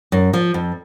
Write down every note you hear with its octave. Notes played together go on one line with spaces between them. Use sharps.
F#2
F3
F2